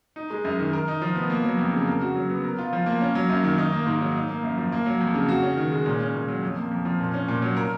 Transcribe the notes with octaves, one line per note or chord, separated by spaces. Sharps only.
D#4
G#3
F#2
D#3
A#4
D#4
F3
B3
A#3
F#3
F2
C#3
A#4
F#4
F#3
B3
A#4
F4
F3
A#3
C#4
F#3
F#2
D#3
D#4
A#3
G#2
F#3
D#4
A#3
F#2
F3
A#3
F#3
F2
C#3
F#4
C#4
D#3
G#3
A#2
C#4
A#2
F#3
F2
A#3
F2
F3
A#2
C#4
A#2
F#3
A#4